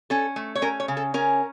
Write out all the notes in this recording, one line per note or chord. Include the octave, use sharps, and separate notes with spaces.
C#4 A4
A3
C#5
C#4 A#4
C#5
C#3
A4
C#4 A#4